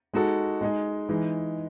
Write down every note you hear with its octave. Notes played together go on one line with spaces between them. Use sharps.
G#3 D#4 F#4 A4
G#3 D#4 G#4
E3 G#3 D#4